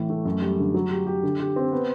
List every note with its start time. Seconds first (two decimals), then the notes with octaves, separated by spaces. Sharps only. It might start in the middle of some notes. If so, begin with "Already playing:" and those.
Already playing: A2 E3
0.10 A3
0.25 F#2
0.42 G3
0.58 D3
0.74 F#3
0.91 G4
1.06 G4
1.23 D3
1.40 G4
1.56 C4
1.72 B3